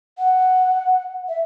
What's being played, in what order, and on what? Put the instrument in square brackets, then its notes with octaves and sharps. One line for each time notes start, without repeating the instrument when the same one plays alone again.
[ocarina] F#5
E5